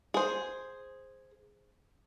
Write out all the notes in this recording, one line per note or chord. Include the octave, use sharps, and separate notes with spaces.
G#4 C5